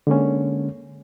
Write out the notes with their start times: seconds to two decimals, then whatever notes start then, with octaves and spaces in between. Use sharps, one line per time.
0.07 D3 G#3 A#3 C#4